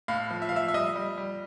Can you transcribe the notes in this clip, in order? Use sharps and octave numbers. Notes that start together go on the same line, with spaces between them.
A2 F5
F3
E5
F5
F3 E5
E5
G3 D#5
G3
G3